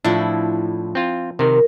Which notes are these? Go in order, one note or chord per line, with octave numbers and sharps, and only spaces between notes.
A2 F3 D4 E4
C4 F4
C3 D#3 A#4